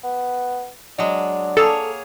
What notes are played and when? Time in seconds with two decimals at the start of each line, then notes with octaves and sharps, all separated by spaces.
0.04 B3
0.99 F#3 G#3 D4
1.57 A#3 G#4 A4 C#5